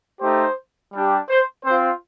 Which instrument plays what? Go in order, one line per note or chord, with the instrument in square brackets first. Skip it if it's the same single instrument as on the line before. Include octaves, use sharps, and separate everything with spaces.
[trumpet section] A3 D#4 G4 C5
G3 D4 G4
C5
C4 F4 C5